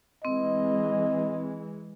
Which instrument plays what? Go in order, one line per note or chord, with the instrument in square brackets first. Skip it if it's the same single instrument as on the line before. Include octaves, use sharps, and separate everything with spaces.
[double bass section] E3 G#3 [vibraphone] C4 [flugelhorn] D#5